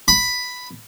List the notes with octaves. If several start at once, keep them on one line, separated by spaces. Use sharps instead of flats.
B5